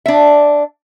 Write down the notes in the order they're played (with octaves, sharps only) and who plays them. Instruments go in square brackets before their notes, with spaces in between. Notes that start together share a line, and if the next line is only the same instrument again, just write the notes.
[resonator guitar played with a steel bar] D4 E5